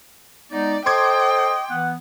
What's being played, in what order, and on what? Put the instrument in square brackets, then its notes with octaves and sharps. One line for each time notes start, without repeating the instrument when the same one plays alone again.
[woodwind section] G#3 B3 D#4 [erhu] D5
[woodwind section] A4 C5 [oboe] D#5 [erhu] G5 [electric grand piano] C6 D6 G#6
[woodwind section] E3 B3 [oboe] F#5